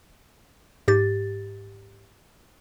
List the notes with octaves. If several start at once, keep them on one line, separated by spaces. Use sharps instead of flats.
G#2 G4 A6